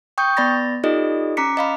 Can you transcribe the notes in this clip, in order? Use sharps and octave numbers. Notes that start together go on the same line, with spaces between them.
G5 C#6 D#6 G6
B3 D5 B5 A6 A#6
D#4 F4 G4 A4 D5 D#5
C#4 A#5 D6 B6 C#7
D#5 F5 B5